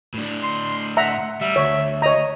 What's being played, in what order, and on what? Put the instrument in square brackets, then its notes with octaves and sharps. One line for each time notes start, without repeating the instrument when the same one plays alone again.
[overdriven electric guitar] A2 D4
[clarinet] C6
[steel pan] E5 A#5 [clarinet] F#5
[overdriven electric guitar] G3 [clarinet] E5
[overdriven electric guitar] D2 [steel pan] C#5
[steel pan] C#5 A#5 [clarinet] D#5